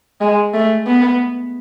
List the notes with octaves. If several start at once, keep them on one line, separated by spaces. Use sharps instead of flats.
G#3
A3
B3